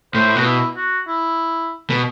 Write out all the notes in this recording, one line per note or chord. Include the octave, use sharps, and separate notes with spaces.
A2 C5
B2 F#4
E4
F#4
E4
B2